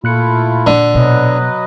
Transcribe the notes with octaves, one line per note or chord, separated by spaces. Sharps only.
A#2 A3 E4 F4 F#6 C#7
D3
B2 F#3 B4 D#5